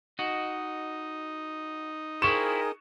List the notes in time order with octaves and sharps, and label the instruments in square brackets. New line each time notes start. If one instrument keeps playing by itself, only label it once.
[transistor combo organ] D#4 [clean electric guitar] F#4 D#5
[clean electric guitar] E4 F4 C5 [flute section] G#4 A#4 G5 [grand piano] C#6 E7